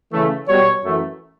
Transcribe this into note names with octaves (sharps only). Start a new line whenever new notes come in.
C#3 E3 A3
B2 G3 C#5
F#2 E3 A3